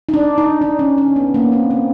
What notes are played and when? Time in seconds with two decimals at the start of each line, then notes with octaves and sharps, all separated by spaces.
0.09 D#4
0.14 D4
0.38 D#4
0.61 D4
0.79 C#4
0.98 C#4
1.16 B3
1.34 A#3
1.52 C4
1.70 C4